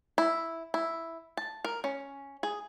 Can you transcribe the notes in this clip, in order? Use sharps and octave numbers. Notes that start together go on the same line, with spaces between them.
E4
E4
A5
A#4
C#4
G#4